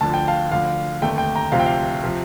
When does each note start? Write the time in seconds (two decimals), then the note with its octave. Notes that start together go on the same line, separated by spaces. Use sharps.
0.01 D2 D3 F3 A5
0.14 G5
0.28 F5 A5
0.51 D2 D3 F3 F5
1.02 F1 D#2 D3 A3 G5
1.18 G5
1.35 G5 A#5
1.52 D2 C3 F3 C4 F5
1.59 G5
1.66 F5
2.04 C3 F3